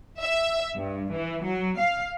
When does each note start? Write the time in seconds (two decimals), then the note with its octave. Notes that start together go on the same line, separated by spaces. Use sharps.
0.21 E5
0.75 G2
1.12 E3
1.44 F#3
1.79 F5